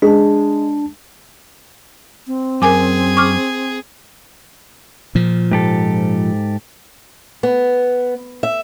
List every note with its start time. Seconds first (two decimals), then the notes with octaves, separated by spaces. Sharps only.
0.02 G#3 D4 A5
2.27 C4
2.62 F#2 G#4 A#4 G#5 D6
3.17 C#6 D6 F6
5.15 A#2 F3
5.52 G#2 G4 A4
7.43 B3
8.43 E5